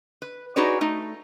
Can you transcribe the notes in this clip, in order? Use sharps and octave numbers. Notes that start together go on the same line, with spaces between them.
B4
D#4 F#4 G#4 B4 C#5 D5
A3 D#4